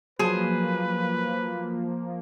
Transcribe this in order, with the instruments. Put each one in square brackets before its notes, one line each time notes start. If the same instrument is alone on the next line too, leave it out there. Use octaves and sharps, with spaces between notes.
[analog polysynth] F3 A#3 [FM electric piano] F#3 [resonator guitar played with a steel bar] G#4 C5 [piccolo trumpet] B4